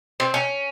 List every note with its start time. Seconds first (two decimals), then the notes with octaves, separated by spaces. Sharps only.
0.20 C4
0.34 C#4